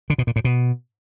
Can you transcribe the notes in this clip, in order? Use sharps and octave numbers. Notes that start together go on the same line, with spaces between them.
D3
B2
A#2
A2
B2